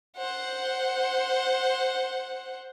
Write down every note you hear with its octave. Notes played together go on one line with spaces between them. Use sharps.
C5 F#5